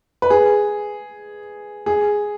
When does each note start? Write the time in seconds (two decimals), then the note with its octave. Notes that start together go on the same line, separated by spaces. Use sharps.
0.22 B4
0.30 G#4
1.86 G#4